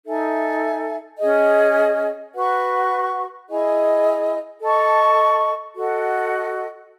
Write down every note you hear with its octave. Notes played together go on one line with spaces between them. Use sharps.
D#4 A4 E5 G#5
C#4 G#4 D#5
F#4 B4 F#5 C#6
E4 G#4 D#5 G#5
A4 D#5 A5 C#6
F#4 A4 D#5 F#5